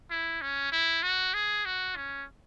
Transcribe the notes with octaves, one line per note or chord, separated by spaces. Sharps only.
E4
C#4
E4
F#4
G#4
F#4
C#4